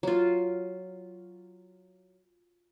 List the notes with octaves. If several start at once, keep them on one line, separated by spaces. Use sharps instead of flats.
F#3 F4